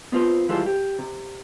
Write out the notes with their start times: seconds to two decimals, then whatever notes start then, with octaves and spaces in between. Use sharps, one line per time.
0.12 B3 C4 F4 B4 C5
0.49 E3 G3 G#3 F4 A4 C5
0.66 G4
0.99 C3